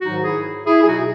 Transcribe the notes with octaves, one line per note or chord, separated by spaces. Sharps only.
G#2 D#3 F#3 D#4 F#4
E4 G#4
E4 G#4
G#4
B2 F#3 D#4 F#4